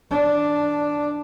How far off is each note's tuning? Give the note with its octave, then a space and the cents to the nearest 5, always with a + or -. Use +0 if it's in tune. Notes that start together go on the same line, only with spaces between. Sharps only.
E3 -45 D4 +0